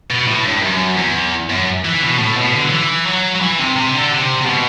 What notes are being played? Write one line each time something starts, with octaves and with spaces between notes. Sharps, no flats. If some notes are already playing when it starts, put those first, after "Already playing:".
B2
A2
G2
F#2
E2
F#2
E3
B2
A2
B2
D3
F#3
E3
F#3
F#3
E3
C3
C3
D3
C3
C3
B2